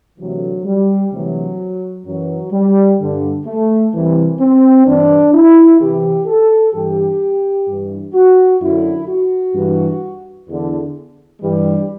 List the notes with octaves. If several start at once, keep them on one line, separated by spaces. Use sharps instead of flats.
D2 C3 E3 F#3
G3
D2 C3 E3 F#3
F#2 E3 F#3
G3
G2 D3
A3
C2 C3 E3
C4
G2 E3 D4
E4
E2 C3 E3 G4
A4
G2 E3 G4
G2 E3
F#4
F#2 D3 E4
F#4
G2 E3
E2 D3
G2 E3 G3